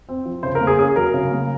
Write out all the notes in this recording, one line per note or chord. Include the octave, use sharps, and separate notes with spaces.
C4
F3
C#3 C5
A#4
A#3
G#4
C#4 G#4
F#3 A#4
C#3
A#3